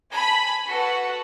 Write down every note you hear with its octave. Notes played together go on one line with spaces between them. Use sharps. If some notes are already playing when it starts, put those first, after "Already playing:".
G#5 A5 B5
F#4 A4 B4 F#5